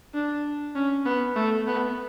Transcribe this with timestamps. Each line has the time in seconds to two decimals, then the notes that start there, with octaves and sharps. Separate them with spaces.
0.14 D4
0.75 C#4
1.06 B3
1.36 A3
1.67 B3